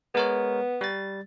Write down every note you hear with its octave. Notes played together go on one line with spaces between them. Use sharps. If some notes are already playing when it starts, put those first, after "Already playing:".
G#3 B3 A#4 C#5
G3 A6